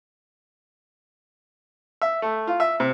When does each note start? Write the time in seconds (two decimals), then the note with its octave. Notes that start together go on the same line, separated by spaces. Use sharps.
2.02 E5
2.22 A3
2.47 F4
2.60 E5
2.80 C3